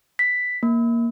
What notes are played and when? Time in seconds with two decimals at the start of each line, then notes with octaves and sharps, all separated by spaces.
0.19 B6
0.63 A#3